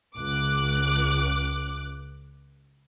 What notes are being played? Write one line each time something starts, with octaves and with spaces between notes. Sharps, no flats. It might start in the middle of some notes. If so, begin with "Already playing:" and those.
C#2 D6 F#6